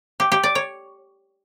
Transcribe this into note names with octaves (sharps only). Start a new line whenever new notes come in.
G4
G4
D5
C#5